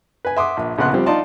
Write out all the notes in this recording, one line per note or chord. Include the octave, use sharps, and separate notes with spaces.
B4 G#5
E5 F#5 C6 D6 D#6
A#1
A#1 C#3 B3 F#5 C6 F#6
F3 G3 C4
D#4 F4 D5 D#5 A5 C6